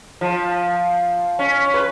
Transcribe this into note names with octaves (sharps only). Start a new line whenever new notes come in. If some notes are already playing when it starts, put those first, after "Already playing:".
F3
C#4
B4